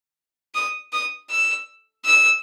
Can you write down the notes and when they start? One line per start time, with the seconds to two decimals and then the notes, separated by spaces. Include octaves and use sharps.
0.55 D#6
0.93 D#6
1.30 E6
2.05 E6